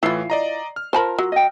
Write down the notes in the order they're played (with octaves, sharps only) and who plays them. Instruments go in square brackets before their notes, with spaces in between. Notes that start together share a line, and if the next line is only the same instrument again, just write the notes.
[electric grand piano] A2 E3 C7 [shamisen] E4 F4
[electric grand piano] D5 D#5 A#5
F6
[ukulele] F4 A#4 [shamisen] C5 A5 B5
[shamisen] F#3
[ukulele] D#5 G5